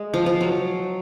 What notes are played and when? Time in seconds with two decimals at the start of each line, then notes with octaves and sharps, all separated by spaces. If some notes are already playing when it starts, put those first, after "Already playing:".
Already playing: G#3
0.14 F3
0.26 F3
0.41 F#3